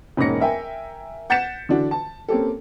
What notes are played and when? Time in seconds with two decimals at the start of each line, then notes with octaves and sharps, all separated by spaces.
0.17 E1 G#2 A#3 C#4 A#6 C#7
0.40 A#4 E5 G5 G#5
1.30 F#5 G6 A6 B6 C#7 E7
1.69 D3 E3 D4 F#4
1.91 A5
2.28 A#3 C4 C#4 G4 A4